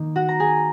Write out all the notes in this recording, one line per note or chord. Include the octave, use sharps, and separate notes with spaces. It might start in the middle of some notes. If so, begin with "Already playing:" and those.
Already playing: D#3 A#3 D#4
F#4 F#5
A#5
G#4 G#5